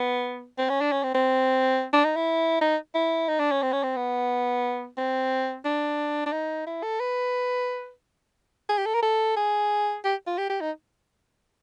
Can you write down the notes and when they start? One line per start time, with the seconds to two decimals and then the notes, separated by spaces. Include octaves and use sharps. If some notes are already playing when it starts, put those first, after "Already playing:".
Already playing: B3
0.58 C4
0.69 C#4
0.81 D4
0.92 C#4
1.03 C4
1.15 C4
1.93 D4
2.05 D#4
2.16 E4
2.61 D#4
2.95 E4
3.29 D#4
3.40 D4
3.51 C#4
3.62 C4
3.73 C#4
3.83 C4
3.96 B3
4.97 C4
5.65 D4
6.26 D4
6.33 D#4
6.66 E4
6.83 A4
7.00 B4
8.69 G#4
8.78 G4
8.86 A4
8.94 A#4
9.02 A4
9.37 G#4
10.04 G4
10.27 F4
10.38 G4
10.50 G4
10.61 D#4